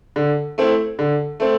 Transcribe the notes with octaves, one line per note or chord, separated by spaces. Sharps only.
D3
A3 C4 E4
D3
A3 C4